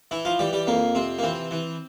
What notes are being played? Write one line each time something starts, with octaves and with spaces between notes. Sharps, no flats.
E3 E4
F3 F4
E3 G3 G4
G3 G4
F2 A#3
C3 C4
A#3
E3 C4
E3